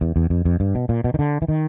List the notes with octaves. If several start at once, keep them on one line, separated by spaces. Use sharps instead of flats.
E2
E2
F2
F2
G2
B2
A#2
B2
D#3
D3
E3
D#3